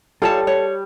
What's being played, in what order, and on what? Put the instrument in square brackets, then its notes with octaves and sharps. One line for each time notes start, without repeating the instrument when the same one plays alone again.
[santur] G3 [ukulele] F4 C#5 A5 [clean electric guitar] A4
[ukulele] C#5